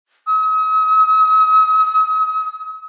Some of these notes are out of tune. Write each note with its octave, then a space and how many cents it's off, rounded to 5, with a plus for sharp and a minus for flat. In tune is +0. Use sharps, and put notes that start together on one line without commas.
D#6 +45